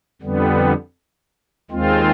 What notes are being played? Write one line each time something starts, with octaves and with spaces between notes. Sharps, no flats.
F2 D3 G3 B3
D#2 D#3 G#3 C4 F4